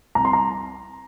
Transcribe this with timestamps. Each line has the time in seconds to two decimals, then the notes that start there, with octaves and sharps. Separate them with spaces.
0.15 C2 A#5
0.25 C6
0.33 A#5